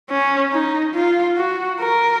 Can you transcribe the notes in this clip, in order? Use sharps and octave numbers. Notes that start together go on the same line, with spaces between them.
C#4
D#4
F4
F#4
A#4